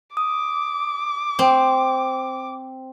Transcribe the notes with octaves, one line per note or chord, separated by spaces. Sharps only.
D6 D#6
C4 C5 G5